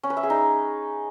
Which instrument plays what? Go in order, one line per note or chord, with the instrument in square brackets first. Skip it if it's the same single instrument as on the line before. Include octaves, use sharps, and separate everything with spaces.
[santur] C#4
B4
E5
G#4
D#4